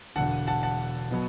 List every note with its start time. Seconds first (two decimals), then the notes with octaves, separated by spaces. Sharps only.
0.16 E1 E2 D3 F#5 A5
0.47 F#5 A5
0.63 F#5 A5
1.11 B2 F#3 B3